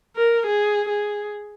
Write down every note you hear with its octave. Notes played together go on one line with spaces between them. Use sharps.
A#4
G#4
G#4